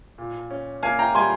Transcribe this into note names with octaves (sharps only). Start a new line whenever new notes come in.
A#2
C#4
A#3 F5 G#5
G5 A#5
G3 G#5 C6